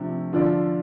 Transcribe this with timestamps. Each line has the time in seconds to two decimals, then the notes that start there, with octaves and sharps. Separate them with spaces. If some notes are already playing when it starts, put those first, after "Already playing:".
Already playing: C3 F3 A3 D4
0.33 D3 F3 D4 F4 D5